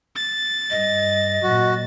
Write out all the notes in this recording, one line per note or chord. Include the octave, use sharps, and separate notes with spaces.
A6
G2 D#5
A#2 F#3 F#4